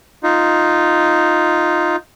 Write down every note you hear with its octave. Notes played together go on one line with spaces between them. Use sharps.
D#4 F4